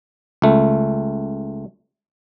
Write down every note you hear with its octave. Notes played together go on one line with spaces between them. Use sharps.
C#2 A3